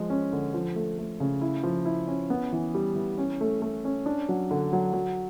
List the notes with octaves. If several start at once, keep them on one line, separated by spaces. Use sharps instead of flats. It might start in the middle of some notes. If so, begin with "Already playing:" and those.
Already playing: F3 G#3
C#4
D3
F3
A3
A3
C#3
E4
F3
E4
C#4
B3
E3
G3
E3
C#4
A3
A3
C#4
D4
F#3
D3
F#3
F#3